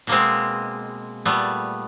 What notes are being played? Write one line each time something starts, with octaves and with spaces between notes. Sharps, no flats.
B2 G#3 A#3 C4
A#2 G3 A3 B3